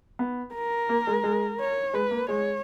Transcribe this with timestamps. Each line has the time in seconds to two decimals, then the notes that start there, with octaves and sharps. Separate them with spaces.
0.19 B3
0.55 A#4
0.89 A#3
1.07 G#3
1.24 G#3
1.60 C#5
1.93 G#3 B4
2.11 A#3
2.28 G#3 C#5